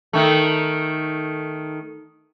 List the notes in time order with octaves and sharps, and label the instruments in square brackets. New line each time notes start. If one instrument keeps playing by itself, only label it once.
[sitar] D#3 A3